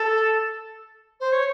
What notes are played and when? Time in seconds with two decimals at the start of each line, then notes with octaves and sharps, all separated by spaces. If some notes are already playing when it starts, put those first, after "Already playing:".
Already playing: A4
1.20 C5
1.32 C#5